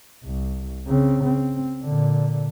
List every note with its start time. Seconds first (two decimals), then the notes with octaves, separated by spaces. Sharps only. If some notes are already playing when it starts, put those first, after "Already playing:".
0.23 C2
0.86 C#3 C4
1.24 C4
1.83 A#2 D3